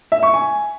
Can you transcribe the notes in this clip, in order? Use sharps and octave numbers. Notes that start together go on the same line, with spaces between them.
E5
C#6
G#5